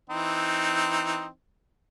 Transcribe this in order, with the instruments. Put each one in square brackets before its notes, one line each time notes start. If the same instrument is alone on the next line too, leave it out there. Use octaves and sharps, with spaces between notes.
[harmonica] E3 C4 D#4